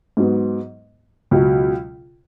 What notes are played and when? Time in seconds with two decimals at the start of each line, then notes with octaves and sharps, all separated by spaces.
0.17 G#2 F#3 B3
1.31 C#2 B2 F#3